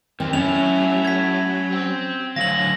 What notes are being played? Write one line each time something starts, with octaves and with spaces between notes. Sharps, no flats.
D#3 A#3 C4
F#3 A3 C#4 E4 F7
G#6 B6
C4
D2 D3 F#3 F5 A#6 F#7